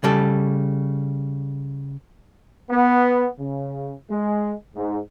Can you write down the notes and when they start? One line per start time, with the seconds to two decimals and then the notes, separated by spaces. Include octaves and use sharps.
0.04 C#3 G3 A4
2.71 B3
3.39 C#3
4.11 G#3
4.76 G#2